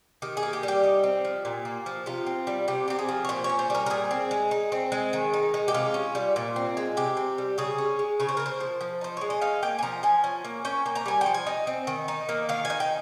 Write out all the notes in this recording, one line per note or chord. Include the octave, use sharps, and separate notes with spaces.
D#3 G4
G#4
A#3
G4
G3
G4
D#4
C4
F3
A#2
A#3
F3
C3 F4
C4
G3
C3 G4
C4 G4
G#4
F3
C#5
A#2 C5
C#5
C#4
C5
G3 A#4
A#4
A#2 G#4
C4
G#3
D#4
C4
G#3
D#3
D#4
G#3
G4
C3 F4
C#4
G3
A#2
C4
G#3
C3 G4
C4
G3
C#3 G#4
C#4
G#3
C#3 C#5
C5
A#3 A#4
C5
F3
F3
D#4 C5
G#3 C#5
D#5
D#4 F5
A#3 G5
G#5
F3 A#5
F3 G#5
C#4
A#3
C#4 G5
A#3
A#5
G3 G#5
G5
F3
G#5
D#4
C4
D#3
D#4
A#3
D#3 F5
G#5
D#4
G5